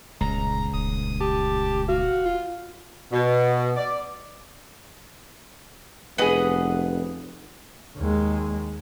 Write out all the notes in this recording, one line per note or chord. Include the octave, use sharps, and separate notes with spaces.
D#1 C#2 A#5
D#1 D#6
G4 A5
F#4 F5
F4
B2
D5
F1 B3 G#4 B4 D#5 F#5
D#2 G#3